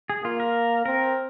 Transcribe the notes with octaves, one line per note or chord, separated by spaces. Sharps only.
G#4
A#3 F4
A#4
C4 A#4